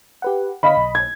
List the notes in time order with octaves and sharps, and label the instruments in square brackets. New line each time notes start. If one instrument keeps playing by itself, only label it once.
[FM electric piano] G4 B4 F#5
[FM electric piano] D3 F5 B6 [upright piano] D#5 B5
[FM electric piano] B1
[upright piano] G#6